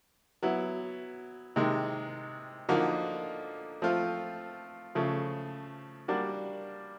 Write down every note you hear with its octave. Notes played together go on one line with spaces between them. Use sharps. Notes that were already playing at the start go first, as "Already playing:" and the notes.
F#3 B3 E4
C3 D#3 G#3
D3 F3 A#3 D#4 F#4
F3 A3 C4 F4
C#3 F3 A3
G3 A#3 D4 F#4